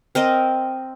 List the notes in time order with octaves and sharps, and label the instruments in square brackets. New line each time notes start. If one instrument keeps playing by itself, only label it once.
[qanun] C4 A#4 D#5